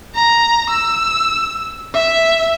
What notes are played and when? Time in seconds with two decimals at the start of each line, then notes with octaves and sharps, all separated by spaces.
0.15 A#5
0.71 E6
1.94 E5